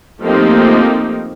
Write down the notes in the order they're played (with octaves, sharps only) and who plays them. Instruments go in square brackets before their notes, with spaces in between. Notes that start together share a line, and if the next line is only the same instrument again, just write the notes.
[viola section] F3 A3 A#3 C4 D#4 G4